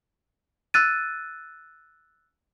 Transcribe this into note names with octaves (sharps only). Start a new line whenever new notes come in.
E6 F#6 A6 D#7